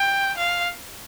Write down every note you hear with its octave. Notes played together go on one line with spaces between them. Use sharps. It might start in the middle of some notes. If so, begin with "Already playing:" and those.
Already playing: G5
F5